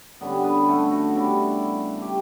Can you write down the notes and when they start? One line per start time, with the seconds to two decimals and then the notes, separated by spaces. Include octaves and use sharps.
0.21 D3 G3 B3 C#4 B4
0.44 B3 B4
0.68 A3 A4
0.91 F#4
1.15 C#3 G3 B3 D4 E4
2.02 G4